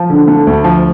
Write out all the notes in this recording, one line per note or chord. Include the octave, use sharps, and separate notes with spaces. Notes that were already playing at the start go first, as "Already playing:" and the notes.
Already playing: F3
D3
A3
D2
F3